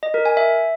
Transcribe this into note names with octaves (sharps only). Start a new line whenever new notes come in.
D#5
A#4
G#5
E5